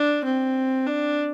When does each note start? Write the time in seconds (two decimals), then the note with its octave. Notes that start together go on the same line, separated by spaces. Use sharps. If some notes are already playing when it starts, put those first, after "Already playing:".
Already playing: D4
0.24 C4
0.87 D4